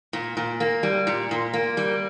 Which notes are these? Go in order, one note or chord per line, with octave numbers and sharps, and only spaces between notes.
A#2
A#2
A#3
G3
A#2
A#2
A#3
G3